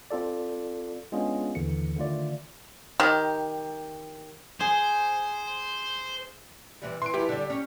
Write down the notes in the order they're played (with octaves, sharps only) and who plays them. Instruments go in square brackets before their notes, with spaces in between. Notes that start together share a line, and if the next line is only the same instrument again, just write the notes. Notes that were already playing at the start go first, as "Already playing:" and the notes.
[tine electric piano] C4 F4 A4 D5
G#3 B3 C#4 D4 F4 G#4
D#2 D3 E3 C#7
D3 D#3 A3 F4 D5
[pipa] D#3 G4
[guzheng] G#4 [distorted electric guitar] C5
[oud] C3 E3 G3
[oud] E3 [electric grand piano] C6 D7
[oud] F3 E4 B4 [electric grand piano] G4
[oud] D3 G3
C#4